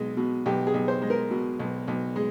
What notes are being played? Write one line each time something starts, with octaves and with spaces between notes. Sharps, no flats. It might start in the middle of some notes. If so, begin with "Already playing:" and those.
Already playing: B1 G#3
B2
B1 G4
G#4
B1
C5
G#3
A#4
B2
B1
B1
G#3